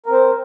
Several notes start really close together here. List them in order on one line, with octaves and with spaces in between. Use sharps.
A#4 C4 C5